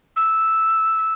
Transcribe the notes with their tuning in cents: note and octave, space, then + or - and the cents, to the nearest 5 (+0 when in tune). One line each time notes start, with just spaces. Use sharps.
E6 -5